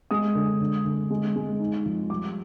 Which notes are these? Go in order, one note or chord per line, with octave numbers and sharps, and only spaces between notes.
G#3 D#6
D3
D3
D3
G#3
G#3
D#4
F3
G3 D6